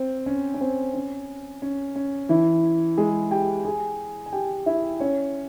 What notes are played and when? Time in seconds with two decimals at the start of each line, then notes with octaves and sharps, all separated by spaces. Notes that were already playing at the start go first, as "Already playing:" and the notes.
Already playing: C4
0.26 C#4
0.54 C#4
0.61 C4
0.94 C#4
1.62 C#4
1.96 C#4
2.29 E3 E4
2.97 G#3 G#4
3.31 G4 G5
3.65 G#4 G#5
4.26 G#5
4.33 G4 G5
4.66 E4 E5
5.00 C#4 C#5